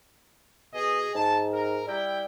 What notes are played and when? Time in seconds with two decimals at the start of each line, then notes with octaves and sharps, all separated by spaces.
0.74 B2 G#4 D#5
1.15 G#2 A5
1.53 A#4
1.87 G3 E4 G5